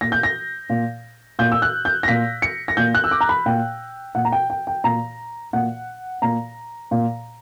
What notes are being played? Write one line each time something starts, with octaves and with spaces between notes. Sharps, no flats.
A#2 A#6
G6
A#6
A#2
A#2 G6
E6
F#6
G6
A#6
A#2 B6
C#7
A#6
A#2 G6
F#6
E6
D6
A#5
B5
A#2 G5
A#2 F#5
A#5
G5
G5
G5
A#2 A#5
A#2 F#5
A#2 A#5
A#2